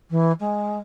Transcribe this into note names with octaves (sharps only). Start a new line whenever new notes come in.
E3
G#3